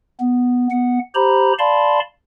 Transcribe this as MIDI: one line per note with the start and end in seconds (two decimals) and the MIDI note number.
0.20 0.68 59
0.71 0.99 59
0.71 0.99 78
1.15 1.53 67
1.15 1.53 72
1.15 1.53 82
1.15 1.53 83
1.59 2.00 74
1.59 2.00 77
1.59 2.00 81
1.59 2.00 83
1.59 2.00 84